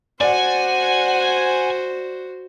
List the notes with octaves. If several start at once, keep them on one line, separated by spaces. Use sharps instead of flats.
F#4 C5 D5 F#5 G#5